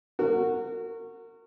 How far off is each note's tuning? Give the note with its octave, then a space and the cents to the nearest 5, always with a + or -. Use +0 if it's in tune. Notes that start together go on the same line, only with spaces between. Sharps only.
F#4 -10 A#4 -35